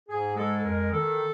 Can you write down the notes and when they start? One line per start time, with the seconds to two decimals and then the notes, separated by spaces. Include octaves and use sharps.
0.08 G#2 G#4
0.36 G#3 A4
0.60 A4
0.64 F2 A#4
0.92 D#3 A4